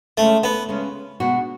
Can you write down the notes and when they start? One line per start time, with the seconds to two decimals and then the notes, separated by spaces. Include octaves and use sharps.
0.18 C#3 G#3 A3 C#4
0.44 B3
0.69 C#3 G#3 C#4
1.20 B2 G#3 D4 F#4